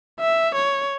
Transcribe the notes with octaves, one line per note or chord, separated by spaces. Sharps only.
E5
C#5